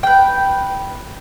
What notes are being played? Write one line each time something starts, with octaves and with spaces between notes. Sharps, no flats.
B4 G5